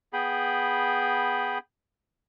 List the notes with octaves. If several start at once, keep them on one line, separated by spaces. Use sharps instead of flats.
B3 G#4 G5 B5